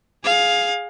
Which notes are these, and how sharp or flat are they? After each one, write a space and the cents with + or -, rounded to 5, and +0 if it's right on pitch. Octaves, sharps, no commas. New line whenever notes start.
G#4 +0 F5 +15